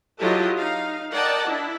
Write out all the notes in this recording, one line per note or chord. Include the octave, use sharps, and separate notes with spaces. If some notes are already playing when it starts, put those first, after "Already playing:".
F#3 E4 F4 G4 A4 D#5
D#4 F5
A#4 D5 D#5 F#5 G5 A5
D4 E4